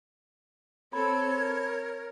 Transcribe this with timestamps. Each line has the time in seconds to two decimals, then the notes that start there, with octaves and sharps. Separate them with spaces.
0.93 C4 A4 C#5 B5 G#6
1.36 A#4